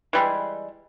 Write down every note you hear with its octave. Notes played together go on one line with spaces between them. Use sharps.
E3 G3 G#3